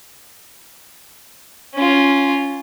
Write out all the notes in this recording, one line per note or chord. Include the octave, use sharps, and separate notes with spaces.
C#4 F4